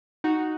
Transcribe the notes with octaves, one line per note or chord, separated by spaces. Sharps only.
D#4 F#4